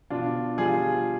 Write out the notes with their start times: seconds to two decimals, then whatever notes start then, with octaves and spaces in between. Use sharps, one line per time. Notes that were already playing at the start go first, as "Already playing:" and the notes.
0.10 B2 D4 F4
0.58 G3 F4 G#4